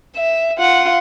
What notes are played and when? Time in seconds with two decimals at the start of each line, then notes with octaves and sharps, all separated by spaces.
0.16 E5
0.58 F4 F#5